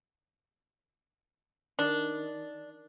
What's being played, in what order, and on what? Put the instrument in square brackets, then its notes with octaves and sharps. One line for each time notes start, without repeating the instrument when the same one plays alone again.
[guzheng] D#3 [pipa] D4